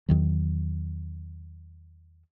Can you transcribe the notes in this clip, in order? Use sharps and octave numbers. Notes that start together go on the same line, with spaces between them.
E2 D#3 F#3